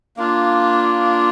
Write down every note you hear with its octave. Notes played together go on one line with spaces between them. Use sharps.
A#3 D4 F4